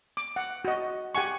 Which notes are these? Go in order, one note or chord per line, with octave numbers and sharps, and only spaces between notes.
D6
F#5
F#4 D#5
G4 F#5 G#5 C#6